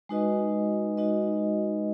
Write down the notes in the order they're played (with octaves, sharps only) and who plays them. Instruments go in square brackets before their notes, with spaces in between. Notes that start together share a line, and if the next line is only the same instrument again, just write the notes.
[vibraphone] G#3 D#4 F#4 B4 D#5
G#3 D#4 F#4 B4 D#5